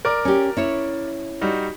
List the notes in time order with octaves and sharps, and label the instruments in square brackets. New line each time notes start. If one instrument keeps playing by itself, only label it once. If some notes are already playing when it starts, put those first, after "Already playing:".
[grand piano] A#4 D5 D6
[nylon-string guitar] C#4 G4
C#4 E4 C#5
[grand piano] G3 D#4 F#4